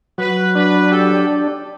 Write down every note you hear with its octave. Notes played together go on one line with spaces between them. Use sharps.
F#3 B4
D4 B4
G4 A4